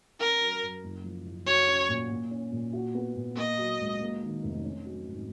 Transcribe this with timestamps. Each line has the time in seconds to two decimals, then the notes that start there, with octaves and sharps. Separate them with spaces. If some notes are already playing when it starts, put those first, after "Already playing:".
0.19 C#4 A#4
0.40 F#3
0.61 F#2
0.84 F#1
1.04 F3
1.25 F#1
1.47 F#4 C#5
1.68 C#4
1.89 A#2
2.10 A#2
2.31 C#4
2.52 A#2
2.73 F#4
2.95 B3
3.16 A#2
3.37 A#3 D#5
3.58 F#3
3.80 C#2
4.00 A#3
4.22 D#3
4.43 F1
4.63 C#4
4.85 F#3
5.06 G#1